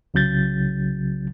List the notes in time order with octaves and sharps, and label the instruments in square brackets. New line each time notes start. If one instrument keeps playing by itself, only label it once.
[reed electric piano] C2 C#3 F#3 G6 A6